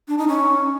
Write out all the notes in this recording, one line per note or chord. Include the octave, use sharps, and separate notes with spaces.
D4
D#4
C#4